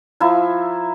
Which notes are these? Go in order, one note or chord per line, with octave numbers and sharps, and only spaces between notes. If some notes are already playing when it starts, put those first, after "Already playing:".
F3 E4 E5 A#5